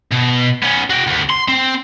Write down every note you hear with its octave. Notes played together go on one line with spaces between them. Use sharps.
B2
B3 C#4
F#4 G5
D2 B3
C6
C4